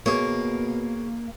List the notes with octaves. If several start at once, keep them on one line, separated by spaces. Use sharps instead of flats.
B2 A#3 G#4 C#5